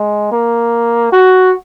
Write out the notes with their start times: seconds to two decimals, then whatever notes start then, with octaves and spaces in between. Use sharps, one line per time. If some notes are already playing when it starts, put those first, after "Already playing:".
Already playing: G#3
0.32 A#3
1.12 F#4